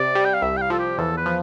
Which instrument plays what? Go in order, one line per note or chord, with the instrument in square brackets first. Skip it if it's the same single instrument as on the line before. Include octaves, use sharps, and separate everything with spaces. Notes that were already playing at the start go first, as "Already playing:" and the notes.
Already playing: [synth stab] C3 [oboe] D5
[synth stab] G3
[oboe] G5
F5
[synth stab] C2 [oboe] E5
[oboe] G5
F5
[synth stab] F3 [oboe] A4
[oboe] G4
[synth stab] E2 [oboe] A4
[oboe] B4
[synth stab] F3